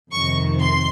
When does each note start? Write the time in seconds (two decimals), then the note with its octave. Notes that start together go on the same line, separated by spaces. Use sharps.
0.11 F2 C3 D#3 C#6
0.60 C6